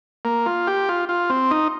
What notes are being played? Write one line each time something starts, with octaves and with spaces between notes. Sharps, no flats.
A#3
F4
G4
F4
F4
C4
D#4